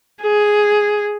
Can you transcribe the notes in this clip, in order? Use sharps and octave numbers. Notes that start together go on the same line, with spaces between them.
G#4